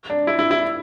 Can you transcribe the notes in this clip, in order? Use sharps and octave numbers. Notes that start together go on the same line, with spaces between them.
D4
E4
E4
E4